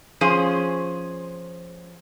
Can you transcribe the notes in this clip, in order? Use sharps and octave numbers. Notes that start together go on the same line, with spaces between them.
F3 C#4 G#4 C5